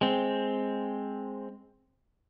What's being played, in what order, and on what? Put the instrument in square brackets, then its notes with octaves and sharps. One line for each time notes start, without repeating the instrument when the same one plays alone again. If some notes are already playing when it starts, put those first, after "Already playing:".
[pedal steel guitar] G#3 C4